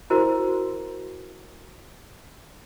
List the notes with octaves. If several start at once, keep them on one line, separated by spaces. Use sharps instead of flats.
E4 F#4 A#4 C5